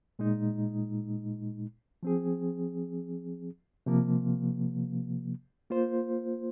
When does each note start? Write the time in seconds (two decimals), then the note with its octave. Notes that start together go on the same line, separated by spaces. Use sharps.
0.19 A#2 G#3 D#4
2.03 F3 C4 G#4
3.86 C3 F3 A#3
5.70 A#3 F4 C5